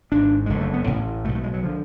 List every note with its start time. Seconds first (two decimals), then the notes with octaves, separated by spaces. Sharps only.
0.12 G#1 G#2 D4
0.46 F#1 F2 D3 G#3
0.60 A3
0.73 B3
0.87 A1 A2 C#4
1.25 B1 B2 A3
1.35 A3
1.43 G#3
1.54 F#3
1.63 D3 F3